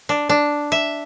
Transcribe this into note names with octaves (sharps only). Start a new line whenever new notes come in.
D4
D4
E5